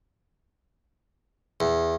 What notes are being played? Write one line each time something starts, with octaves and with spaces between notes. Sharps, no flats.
E2